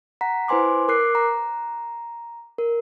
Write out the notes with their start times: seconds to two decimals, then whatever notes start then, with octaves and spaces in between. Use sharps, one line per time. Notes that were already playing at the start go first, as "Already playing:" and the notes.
0.21 F#5 A#5 B6
0.48 E4 B4 C5 G#5 C6 D6
0.88 A#4 D6 F#6 C7
1.15 A#5
2.59 A#4